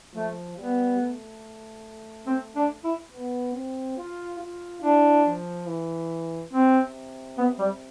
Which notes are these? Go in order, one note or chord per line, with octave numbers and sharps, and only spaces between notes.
F3 A3
G3 B3
A3
C4
D4
E4
B3
C4
F4
F4
D4 E4
F3
E3
C3 C4
B3
G3